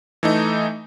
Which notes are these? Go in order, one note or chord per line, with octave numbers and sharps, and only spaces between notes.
E3 A3 D#4